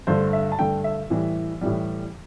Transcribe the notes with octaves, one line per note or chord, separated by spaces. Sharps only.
G2 D3 A3 C5
E5
A5
G2 D3 A3 G5
E5
A2 E3 G3
A2 E3 G3